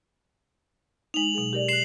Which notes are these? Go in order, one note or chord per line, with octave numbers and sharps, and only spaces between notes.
G#3 D#4 F7 F#7
B2 F#3 G#4
G4 A#4 D5
C6 F#6 C7 E7 F#7